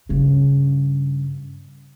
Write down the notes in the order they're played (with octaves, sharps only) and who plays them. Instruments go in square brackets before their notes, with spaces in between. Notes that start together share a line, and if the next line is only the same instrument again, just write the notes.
[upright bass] G2 C#3